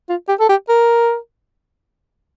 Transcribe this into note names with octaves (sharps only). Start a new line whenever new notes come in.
F4
G4
A4
G4
A#4